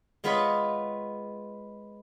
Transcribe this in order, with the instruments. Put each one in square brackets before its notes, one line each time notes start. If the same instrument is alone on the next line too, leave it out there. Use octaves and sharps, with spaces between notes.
[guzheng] G#3 B3 F4 B4 C#5 D#5